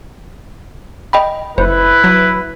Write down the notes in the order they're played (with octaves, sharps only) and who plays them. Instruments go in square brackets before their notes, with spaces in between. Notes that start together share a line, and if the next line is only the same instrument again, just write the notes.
[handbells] D#5 G5 B5
[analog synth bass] F#1 [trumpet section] E4 B4 [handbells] C5
[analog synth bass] F#3